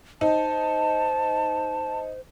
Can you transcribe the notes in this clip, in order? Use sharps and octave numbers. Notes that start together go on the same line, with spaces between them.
D#4 C5 A5